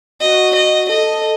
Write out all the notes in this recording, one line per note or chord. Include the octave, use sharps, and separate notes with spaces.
F#4 D#5
D#5
A4 D#5